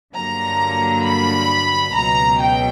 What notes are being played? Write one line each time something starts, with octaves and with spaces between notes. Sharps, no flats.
G2 D3 F#3 A#3 A#5
B5
C#2 B2 F#3 A#5
G5